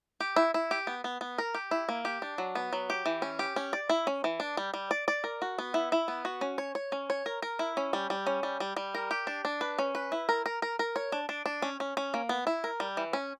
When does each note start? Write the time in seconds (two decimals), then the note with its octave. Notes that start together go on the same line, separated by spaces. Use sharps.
0.20 G4
0.36 E4
0.54 E4
0.71 G4
0.87 B3
1.04 B3
1.21 B3
1.38 A#4
1.54 G4
1.71 E4
1.89 A#3
2.05 G4
2.22 D4
2.38 F#3
2.55 B3
2.73 F#3
2.90 G4
3.06 E3
3.22 C#4
3.39 G4
3.56 C#4
3.73 D5
3.89 E4
4.07 C#4
4.24 E3
4.40 D4
4.57 G3
4.74 G3
4.91 D5
5.08 D5
5.24 A#4
5.42 F#4
5.58 B3
5.74 E4
5.92 E4
6.08 B3
6.25 F#4
6.41 C#4
6.58 C#5
6.75 C#5
6.92 C#4
7.10 C#5
7.26 A#4
7.42 A#4
7.59 E4
7.77 C#4
7.93 G3
8.10 G3
8.27 C#4
8.43 G3
8.60 G3
8.77 G3
8.95 A#4
9.11 G4
9.27 D4
9.45 D4
9.61 B4
9.79 C#4
9.95 B4
10.12 E4
10.29 A#4
10.46 A#4
10.62 A#4
10.79 A#4
10.96 C#5
11.12 D4
11.29 D4
11.46 D4
11.62 C#4
11.80 C#4
11.97 C#4
12.14 A#3
12.29 B3
12.47 E4
12.64 A#4
12.80 G3
12.97 E3
13.13 C#4